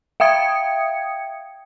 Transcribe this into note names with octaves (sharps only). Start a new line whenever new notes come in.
E5 F5 G5 D#6 G#6 C#7